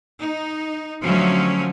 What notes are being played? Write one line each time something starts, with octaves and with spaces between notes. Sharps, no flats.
D#4
D3 F3 F#3 A3 C#4